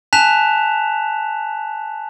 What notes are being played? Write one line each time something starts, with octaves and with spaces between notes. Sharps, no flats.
G#5 A5 F#6 B6 E7 F7